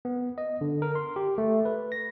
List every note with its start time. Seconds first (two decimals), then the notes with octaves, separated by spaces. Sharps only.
0.05 B3
0.38 D#5
0.61 D3
0.82 A#4
0.95 C6
1.16 G4
1.38 A3
1.65 B4
1.92 A#6